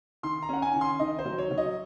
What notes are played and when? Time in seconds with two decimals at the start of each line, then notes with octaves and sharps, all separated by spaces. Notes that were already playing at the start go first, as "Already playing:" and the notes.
0.23 D#3 C6
0.42 A#5
0.49 C#4 F#5
0.62 G#5
0.75 D#3
0.81 C6
0.99 D#3 D#5
1.19 C5
1.25 F#3
1.38 C#5
1.51 F#3
1.58 D#5